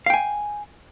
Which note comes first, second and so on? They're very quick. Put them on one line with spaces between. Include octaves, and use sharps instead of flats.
F5 G5 G#5